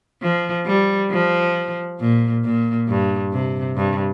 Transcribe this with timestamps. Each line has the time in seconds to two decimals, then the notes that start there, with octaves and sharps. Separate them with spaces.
0.22 F3
0.66 G3
1.11 F3
2.00 A#2
2.44 A#2
2.88 G2
3.33 C3
3.76 G2